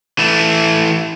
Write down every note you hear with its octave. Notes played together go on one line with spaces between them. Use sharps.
E3 A3